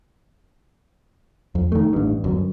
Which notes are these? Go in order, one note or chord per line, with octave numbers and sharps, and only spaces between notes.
F2
D#3 A3
A1 G2
G1 F#2